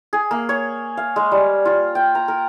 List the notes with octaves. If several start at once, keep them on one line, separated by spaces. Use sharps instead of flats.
G#4
A#3
C#5
F5
G#3
G3
F4
G5
A#5
A#4